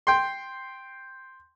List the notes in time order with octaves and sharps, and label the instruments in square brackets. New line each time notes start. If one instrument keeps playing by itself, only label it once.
[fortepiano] G5 C6